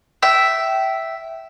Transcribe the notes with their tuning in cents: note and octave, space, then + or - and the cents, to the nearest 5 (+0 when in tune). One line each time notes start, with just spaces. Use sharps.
E5 +0 G5 -20